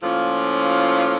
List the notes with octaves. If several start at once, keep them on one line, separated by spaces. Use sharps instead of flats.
A2 F3 A#3 C#4 F4